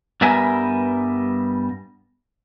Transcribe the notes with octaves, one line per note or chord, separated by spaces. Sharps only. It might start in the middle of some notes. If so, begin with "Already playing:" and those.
G2 G3 B3 A#4 E5 G#5